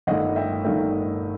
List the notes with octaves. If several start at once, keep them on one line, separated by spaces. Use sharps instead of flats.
G1 G2 D#3 A3 D#5 F#5
E5 G5
G1 G2 D#3 A3 E5 G5